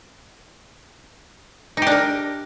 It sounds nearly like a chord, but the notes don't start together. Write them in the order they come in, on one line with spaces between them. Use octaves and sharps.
D#4 G4 D4 A#4